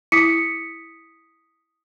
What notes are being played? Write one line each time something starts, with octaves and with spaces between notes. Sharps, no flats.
E4 D#6 B6 C#7